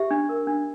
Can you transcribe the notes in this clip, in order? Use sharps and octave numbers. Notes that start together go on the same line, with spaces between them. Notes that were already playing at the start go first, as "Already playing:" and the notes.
Already playing: G4 E5
D4
A#4
D4